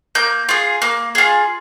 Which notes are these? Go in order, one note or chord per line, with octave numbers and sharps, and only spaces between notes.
A#3 G6
F4 G#4
A#3
F4 G#4